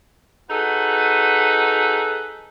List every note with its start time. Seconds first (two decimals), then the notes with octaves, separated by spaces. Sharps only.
0.49 D#4 F#4 G#4 A4 B4